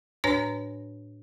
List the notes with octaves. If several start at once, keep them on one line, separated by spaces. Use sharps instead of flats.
A2 D4 B4 C#5 G#5 A#6